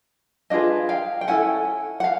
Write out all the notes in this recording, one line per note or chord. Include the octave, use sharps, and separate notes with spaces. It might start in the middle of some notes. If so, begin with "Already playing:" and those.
D4 F4 G#4 B4 D#5 F5
F5 G5
G5
C#4 E4 A4 F#5 G#5
F#5
F5